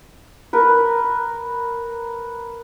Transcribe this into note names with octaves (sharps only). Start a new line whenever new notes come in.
A#4 B4